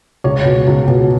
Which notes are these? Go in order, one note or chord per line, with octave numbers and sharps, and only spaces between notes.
C#2 C#5
B2
C#2
B2